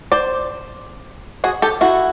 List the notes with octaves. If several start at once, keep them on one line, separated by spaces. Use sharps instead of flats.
C5 D5
F#4 G#4
G4 A4
E4 F#4